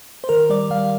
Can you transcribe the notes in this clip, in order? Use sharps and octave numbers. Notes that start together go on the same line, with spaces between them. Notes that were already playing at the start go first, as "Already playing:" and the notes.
C5
D#3 A#4
G3 D5
G3 F5